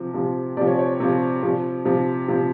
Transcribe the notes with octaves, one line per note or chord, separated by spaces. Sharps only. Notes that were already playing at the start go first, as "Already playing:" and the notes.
Already playing: C3 F3
C3 F3
C3 F3 D5
C#5
C#5
C3 F3
C3 F3
C3 F3
C3 F3